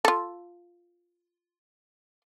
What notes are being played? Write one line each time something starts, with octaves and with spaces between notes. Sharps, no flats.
F4 A4